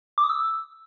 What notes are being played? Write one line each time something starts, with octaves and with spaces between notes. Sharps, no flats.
D6
D#6
E6